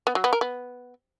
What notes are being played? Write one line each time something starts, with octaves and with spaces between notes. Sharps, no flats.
B3
F#3
B3
A#4
B3